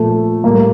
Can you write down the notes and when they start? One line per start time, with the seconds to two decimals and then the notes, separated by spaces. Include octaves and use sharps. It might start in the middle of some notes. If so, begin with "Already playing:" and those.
Already playing: A#2 F3 A3
0.44 A2 G3 A#3